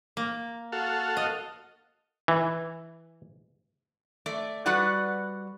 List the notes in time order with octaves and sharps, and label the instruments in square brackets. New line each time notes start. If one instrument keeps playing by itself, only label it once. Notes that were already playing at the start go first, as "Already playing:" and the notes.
[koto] A#3
[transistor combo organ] F#4 A4 F5
[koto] D#5
[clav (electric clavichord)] E3
[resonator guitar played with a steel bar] A3 D5
G3 F#4 B4 D5 F#5